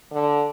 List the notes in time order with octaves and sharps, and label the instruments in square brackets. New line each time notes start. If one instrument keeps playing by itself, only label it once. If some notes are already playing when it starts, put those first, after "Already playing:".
[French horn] D3